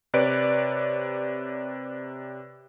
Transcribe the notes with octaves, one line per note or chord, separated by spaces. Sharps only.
C3 B4 C#5 D5 D7